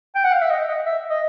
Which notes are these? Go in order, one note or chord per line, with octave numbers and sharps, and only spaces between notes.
G5
F#5
F5
E5
D#5
D#5
E5
D#5